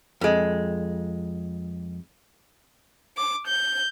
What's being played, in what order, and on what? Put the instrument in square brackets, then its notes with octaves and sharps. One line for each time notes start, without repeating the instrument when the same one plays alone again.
[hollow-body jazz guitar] F2 G#3
[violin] D6
G6